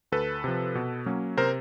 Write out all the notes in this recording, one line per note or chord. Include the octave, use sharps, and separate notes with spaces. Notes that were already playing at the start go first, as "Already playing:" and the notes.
D2 A4 B4
C3 F3
B2
F#3 A#3 C#4
C3 A#4 C5